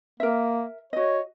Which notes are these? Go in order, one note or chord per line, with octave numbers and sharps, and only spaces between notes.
A#3 A#4 E5
F#4 C#5 D#5